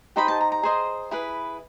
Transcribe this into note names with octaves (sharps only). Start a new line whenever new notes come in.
D#4 G4 C5 D#5 B5
A5
A#5
A#5
G#4 C5 D#5
E4 G#4 B4